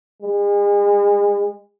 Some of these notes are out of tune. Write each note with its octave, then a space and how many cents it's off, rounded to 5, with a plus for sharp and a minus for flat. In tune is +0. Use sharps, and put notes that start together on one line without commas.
G#3 -35